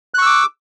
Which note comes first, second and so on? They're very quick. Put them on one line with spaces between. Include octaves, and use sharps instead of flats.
F#6 C#6 E6 D6